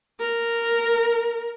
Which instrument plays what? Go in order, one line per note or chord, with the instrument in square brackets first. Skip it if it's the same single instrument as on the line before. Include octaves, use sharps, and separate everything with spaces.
[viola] A#4